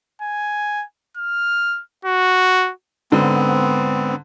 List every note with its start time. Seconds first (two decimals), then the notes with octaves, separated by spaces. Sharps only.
0.22 G#5
1.17 F6
2.05 F#4
3.12 G#2 D3 B3 C4